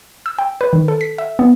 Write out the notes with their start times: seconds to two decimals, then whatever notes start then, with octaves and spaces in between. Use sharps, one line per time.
0.26 E6
0.39 G5
0.61 B4
0.73 D#3
0.88 A4
1.01 B6
1.18 E5
1.39 B3